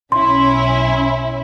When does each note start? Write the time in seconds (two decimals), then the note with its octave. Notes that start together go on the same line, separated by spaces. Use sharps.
0.12 B1 C#4 E4 C6